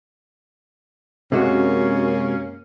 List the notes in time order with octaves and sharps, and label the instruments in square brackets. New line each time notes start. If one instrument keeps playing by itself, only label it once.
[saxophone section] F#2 A#3 C#4 [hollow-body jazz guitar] C3 G#3 F#4